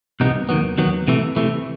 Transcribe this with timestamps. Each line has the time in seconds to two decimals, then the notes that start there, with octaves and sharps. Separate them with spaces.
0.20 C2 C3 E3 B3 D#4
0.49 D#2 D#3 F#3 B3
0.78 D#2 D#3 F#3 B3
1.08 C3 E3 A3
1.36 C3 E3 A3